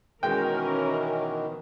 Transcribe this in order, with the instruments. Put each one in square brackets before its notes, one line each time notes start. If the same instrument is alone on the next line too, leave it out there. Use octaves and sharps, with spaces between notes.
[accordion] B2 D#3 E3 [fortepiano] G#3 G5 [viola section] C#4 A#4